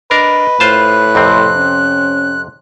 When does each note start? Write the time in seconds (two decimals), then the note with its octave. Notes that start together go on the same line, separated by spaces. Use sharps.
0.11 D4 A#4 B4 D#5
0.60 A2 F4 C5 A5 F#6
1.15 F2 C3 C4
1.56 C#4